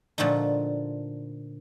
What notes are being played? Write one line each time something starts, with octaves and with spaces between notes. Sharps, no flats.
A#2 D3 F3 A3 D#4